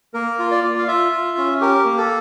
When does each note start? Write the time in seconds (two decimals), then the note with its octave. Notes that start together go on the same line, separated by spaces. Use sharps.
0.14 A#3 A#4
0.39 F4
0.51 D5
0.64 F4
0.78 F5
0.88 F4 E5
1.12 F4
1.37 C#4
1.61 G4 A#4
1.85 A#3
1.97 A4